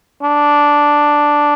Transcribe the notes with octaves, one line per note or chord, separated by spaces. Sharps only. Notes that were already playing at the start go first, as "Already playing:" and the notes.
D4